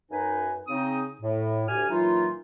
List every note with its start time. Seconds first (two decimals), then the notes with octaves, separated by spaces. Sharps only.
0.11 F#2 D#4 B4 G#5
0.68 C#3 C4 D#4 D#6
1.21 A2
1.68 D2 G4 G#5 F6
1.89 A#2 E3 F#3 A#3 D#4 F4